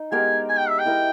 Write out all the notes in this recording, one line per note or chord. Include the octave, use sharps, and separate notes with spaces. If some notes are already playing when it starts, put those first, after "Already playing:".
Already playing: D#4
G#3 B3 G4 A#4 G#5
G#5
G5
E5
G5
E4 A#4 D#5